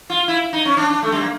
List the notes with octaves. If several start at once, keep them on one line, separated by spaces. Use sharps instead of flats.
F4
E4
D#4
C#4
D4
D4
A3
G3
A#3